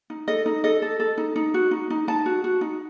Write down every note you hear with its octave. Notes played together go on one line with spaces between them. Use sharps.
D#4
A4 D#5
D#4
A4 D#5
A4
A4
D#4
D#4
F#4
D#4
D#4
D#4 A5
F#4
F#4
D#4